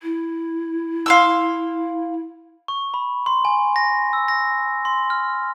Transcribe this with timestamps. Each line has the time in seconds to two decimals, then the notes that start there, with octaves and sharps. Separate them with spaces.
0.02 E4
1.06 F5 C6 E6
2.68 C#6
2.94 B5
3.26 C6
3.45 G#5
3.76 A#6
4.13 E6
4.28 A#6
4.85 C6
5.10 F6